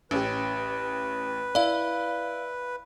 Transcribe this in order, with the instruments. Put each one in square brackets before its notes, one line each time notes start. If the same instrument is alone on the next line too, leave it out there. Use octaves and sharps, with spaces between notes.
[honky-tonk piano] A1 C#4 G4 [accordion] B4
[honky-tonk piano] E4 [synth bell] D5 F5